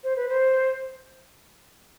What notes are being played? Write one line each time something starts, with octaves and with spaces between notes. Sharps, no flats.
C5
B4
C5